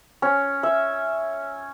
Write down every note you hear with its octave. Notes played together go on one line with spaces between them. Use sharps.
C#4
E5